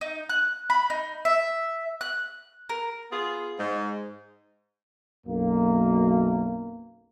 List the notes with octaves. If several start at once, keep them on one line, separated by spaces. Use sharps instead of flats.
D#4
F#6
B5
D#4
E5
F#6
A#4
B3 F4 G#4
G#2
B1 F#2 A#3